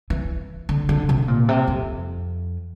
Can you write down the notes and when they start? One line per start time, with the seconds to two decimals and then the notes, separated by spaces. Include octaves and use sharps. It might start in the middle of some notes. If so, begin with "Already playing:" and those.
0.10 E3
0.69 D3
0.89 D3
1.09 C3
1.28 A#2
1.48 C3
1.67 F2